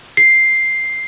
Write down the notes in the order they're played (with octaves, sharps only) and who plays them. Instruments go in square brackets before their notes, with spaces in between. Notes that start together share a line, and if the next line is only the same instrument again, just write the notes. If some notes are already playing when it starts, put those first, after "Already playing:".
[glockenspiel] C7